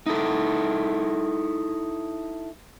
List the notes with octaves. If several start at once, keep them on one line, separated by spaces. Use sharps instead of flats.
D#4 E4 A4